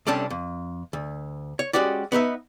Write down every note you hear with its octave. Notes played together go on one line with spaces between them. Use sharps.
C2 C3 G3 C#4 D4 A4
F2
D2
C#5
G#3 A#3 C#4 F#4 G4 D5
B3 D#4 B4 E5